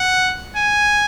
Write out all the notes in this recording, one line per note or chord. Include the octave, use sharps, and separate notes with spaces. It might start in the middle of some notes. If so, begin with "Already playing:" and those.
Already playing: F#5
G#5